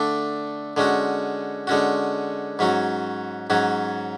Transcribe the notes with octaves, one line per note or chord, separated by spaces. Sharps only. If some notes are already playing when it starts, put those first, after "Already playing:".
Already playing: D3 A3 D4
D3 G#3 C#4 F#4
D3 G#3 C#4 F#4
G#2 F#3 C#4 F#4
G#2 F#3 C#4 F#4